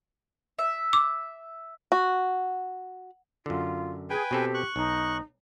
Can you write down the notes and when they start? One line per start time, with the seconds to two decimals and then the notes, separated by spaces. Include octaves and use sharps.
0.59 E5
0.93 D6
1.92 F#4
3.46 F#2 D3 F4
4.10 G#4 B4 G5 G#5
4.31 B2 C4 G4 A4
4.54 C#6 F#6
4.76 B1 D#4